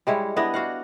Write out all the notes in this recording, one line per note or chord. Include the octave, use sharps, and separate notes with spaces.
G3 G#3 E4 C#5
B3 D4 E4 D#5
F#4 F5 F#5